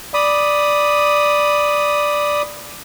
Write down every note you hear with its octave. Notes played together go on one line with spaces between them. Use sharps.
D5 B5 D#6